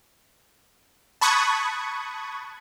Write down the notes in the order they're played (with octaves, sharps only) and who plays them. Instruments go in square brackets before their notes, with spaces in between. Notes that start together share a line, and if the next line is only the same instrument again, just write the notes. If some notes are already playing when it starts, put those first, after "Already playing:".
[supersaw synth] A5 B5 C#6 D#6 F#6 G#6